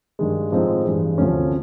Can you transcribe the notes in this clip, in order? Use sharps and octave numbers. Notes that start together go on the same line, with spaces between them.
G2 D#3 G#3
A2 F3 G#3 C4 D#4
G2 E3 G#3
D2 C3 F3 A3 C#4